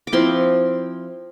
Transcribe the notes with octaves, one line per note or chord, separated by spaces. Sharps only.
D6
F3 C4 E4 C6